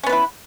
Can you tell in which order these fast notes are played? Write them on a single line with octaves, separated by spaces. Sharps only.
C#4 B3 B4 E4